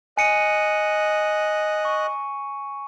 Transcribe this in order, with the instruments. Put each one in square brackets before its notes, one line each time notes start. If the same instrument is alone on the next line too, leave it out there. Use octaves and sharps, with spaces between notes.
[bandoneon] D#5 F#6 [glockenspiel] G#5 C#7 D#7
[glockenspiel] C#6